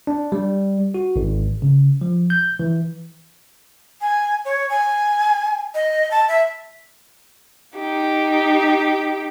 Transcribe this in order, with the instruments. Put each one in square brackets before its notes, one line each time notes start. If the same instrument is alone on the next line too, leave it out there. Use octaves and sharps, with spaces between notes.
[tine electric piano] D4
G3
F#4
G#1
C#3
F3
G6
E3
[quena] G#5
C#5
G#5
D#5
A5
E5
[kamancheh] D#4 G4